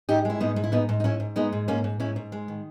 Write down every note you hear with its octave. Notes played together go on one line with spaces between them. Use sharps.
G#2 D#4 G4
G#3 E4
G#2 B3 D#4
G#2
E4
G#2 B3 D#4
G#2
D#4
G#2 C#4 E4
G#2
G#3 B3 D#4
G#2
G#2 A#3 C#4
G#2
G#2 C#4 E4
G#2
G#3
D#3